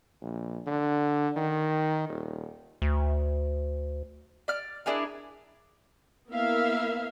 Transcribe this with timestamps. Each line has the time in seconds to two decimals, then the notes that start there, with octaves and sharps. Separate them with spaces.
0.22 A#1
0.67 D3
1.36 D#3
2.09 D#1
2.82 D2
4.48 D5 F6
4.86 D4 E4 G#4 A#4
6.30 A#3 B3 E4 A#4 E5 F5